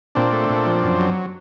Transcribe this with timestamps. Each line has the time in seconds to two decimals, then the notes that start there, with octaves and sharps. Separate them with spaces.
0.15 A#2 C4 D4
0.33 A3
0.50 A#2
0.66 F3
0.83 F#2
0.99 F#3